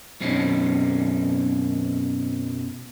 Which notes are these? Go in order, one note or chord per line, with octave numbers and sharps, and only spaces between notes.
F#2 B2 C4 C#4 D#4